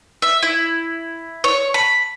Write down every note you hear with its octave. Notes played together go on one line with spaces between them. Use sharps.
E5
E4
C#5
B5